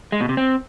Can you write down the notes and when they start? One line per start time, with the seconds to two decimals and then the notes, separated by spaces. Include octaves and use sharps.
0.12 G#3
0.21 B2
0.29 C3
0.37 C4